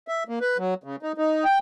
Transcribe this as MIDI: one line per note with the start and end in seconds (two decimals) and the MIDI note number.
0.08 0.24 76
0.29 0.39 58
0.41 0.57 71
0.58 0.74 54
0.84 0.96 49
1.03 1.12 63
1.18 1.44 63
1.45 1.59 79